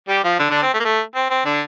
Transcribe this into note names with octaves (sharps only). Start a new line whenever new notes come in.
G3 G4
F3 F4
D3 D4
D3 D4
C4
A3
A#3
A3
C4
C4
D3 D4